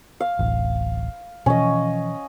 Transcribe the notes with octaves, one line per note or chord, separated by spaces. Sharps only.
F5
D1 A1
B2 E3 F3 C#4 D#5